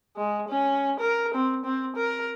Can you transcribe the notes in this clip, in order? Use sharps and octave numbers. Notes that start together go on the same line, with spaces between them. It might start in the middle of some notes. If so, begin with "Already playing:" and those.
G#3
C#4
A#4
C4
C4
A#4